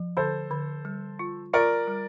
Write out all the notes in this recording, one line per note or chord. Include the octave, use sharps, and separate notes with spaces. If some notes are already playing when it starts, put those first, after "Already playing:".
Already playing: F3
D3 A4 C5
D3
G3
F4
F4 A#4 D5
G3